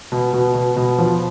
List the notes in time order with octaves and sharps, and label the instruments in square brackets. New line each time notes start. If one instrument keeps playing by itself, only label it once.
[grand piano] B2
B2
B2
B2
F3